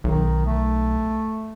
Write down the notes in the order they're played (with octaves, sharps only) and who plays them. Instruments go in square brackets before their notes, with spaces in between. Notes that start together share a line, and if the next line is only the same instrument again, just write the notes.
[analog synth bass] B1 [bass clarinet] D#3
[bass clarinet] A3